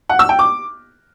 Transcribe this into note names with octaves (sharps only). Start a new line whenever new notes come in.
F#5
E6
G5
D6